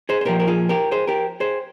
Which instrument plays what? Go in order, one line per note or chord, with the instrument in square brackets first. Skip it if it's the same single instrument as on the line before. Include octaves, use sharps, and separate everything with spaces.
[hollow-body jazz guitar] G#4 C5
C5
A#2 F3 G4 A#4
A#4
F4 G#4
G4 A#4
G#4 C5
G4 A#4
G#4 C5